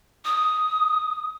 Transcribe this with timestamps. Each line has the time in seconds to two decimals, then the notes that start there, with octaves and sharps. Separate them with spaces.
0.24 D#6